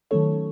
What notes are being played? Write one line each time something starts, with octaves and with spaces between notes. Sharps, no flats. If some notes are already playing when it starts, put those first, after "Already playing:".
D#3 F#3 A3 C#4 A4 C#5